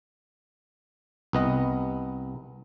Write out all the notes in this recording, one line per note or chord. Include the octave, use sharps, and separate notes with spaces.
C2 B3 D#5